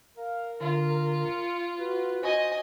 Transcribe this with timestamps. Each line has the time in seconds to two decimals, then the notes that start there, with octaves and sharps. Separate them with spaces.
0.17 A#4 F5
0.61 D3 F4
1.25 C#7
1.78 F#4 B4
2.22 F#4 C5 D#5 G#5